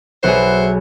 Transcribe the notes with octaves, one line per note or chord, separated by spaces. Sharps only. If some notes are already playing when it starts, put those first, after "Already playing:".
B1 B3 G#4 C5 E5 F#5